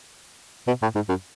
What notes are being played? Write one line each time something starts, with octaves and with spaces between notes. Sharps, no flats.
B2
A2
G#2
F#2